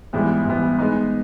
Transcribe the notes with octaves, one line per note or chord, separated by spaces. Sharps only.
G#2 E3 G3 B3
G#2 E3 G3 B3
G#3 B3 D#4